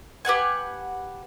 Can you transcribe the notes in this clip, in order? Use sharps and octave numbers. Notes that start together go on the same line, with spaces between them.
G4 B4 F#5 G#5